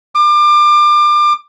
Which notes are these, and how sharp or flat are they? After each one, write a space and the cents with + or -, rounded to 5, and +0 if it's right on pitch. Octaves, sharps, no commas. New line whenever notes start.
D6 +30